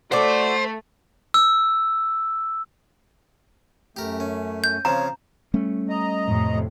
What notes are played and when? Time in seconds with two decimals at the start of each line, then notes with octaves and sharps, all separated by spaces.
0.12 A3 F#4 C5 D5
1.34 E6
3.97 F#2 A3 G4 A#4
4.20 C#4
4.64 G6
4.85 C#3 F3 C4 C#5 A#5
5.54 G3 A3 C#4
5.89 D#5 A#5
6.26 F2 A2 C3